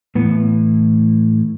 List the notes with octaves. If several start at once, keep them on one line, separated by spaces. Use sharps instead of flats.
A2 E3 B3